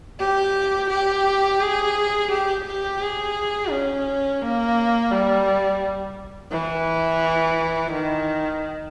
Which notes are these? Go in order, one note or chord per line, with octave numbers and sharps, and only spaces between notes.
G4
G4
G#4
G4
G4
G#4
C#4
A#3
G3
E3
D#3